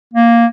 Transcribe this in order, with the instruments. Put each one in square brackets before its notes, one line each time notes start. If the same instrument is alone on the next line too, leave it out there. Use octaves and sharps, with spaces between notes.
[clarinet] A#3